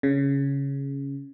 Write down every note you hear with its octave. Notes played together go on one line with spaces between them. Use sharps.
C#3